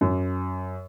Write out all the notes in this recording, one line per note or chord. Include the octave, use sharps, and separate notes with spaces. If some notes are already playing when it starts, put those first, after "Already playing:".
F#2